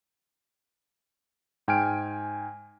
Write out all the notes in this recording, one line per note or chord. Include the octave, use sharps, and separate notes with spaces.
G#2 G5 G#5 F6 D7